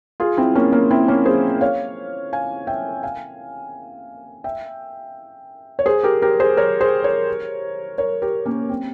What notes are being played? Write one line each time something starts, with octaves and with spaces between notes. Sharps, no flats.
F4 G#4
C4 E4
A#3 C#4
A#3 C#4
C4 E4
A#3 C#4
G#4 C5
C#5 F5
F5 G#5
E5 G5
F5 G#5
E5 G5
C#5
G#4 C5
G4 A#4
G4 A#4
G#4 C5
A#4 C#5
G#4 C5
A#4 C#5
A#4 C#5
G4 A#4
A#3 C#4
C4